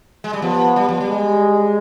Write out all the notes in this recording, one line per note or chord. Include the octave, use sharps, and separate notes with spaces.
G#3
G3
F3 B3
G3
F3
G3
G#3